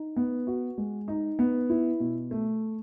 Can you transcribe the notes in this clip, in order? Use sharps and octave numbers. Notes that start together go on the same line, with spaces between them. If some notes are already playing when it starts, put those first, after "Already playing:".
Already playing: D#4
B3
F#4
G#3
D#4
B3
E4
B2
A3